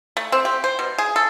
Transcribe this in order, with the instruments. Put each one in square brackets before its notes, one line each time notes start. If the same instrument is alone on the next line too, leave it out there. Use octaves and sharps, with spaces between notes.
[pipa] A3
C4
G4
C5
B2
G#4
A4